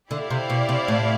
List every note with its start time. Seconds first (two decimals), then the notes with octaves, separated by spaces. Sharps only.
0.11 D3 E4 G4 D5 F5
0.30 C3
0.50 B2
0.69 C3
0.88 A2